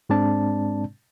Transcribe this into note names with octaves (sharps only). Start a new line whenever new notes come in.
G#2 G#3 C4 D4 D5 A5